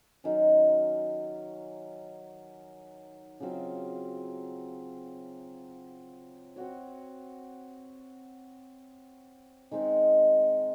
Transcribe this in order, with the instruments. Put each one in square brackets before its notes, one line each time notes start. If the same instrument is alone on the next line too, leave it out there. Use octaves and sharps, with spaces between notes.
[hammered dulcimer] D#3 F#3 C#4
C#3 F#3 C4 F4
C4 F#4 C#5
D#3 G#3 C4